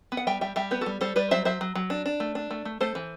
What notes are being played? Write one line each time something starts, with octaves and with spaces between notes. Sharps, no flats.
B3
F#5
G3 E5 G5
G3 E5 G5
G3 E5 G5
B3 G4 B4
F#4 A4
G3
G3 A4 C5
G3 B4 D5
F#3 C5 E5
F#3 C5 E5
F#3
F#3
D4
D4
A3
D4
A3
A3
A3 A4 C5
E3